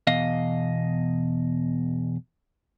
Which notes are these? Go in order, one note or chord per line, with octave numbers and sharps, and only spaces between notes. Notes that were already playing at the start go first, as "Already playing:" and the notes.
E2 B2 D#5 F5